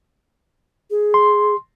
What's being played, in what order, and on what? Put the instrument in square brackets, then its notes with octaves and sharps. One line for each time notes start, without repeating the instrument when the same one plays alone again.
[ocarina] G#4
[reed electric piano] C6